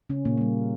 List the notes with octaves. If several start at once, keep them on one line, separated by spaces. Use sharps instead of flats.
C#3 C#4
A#2 A#3
A#3
G3